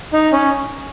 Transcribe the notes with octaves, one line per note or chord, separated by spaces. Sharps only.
D#4
C#4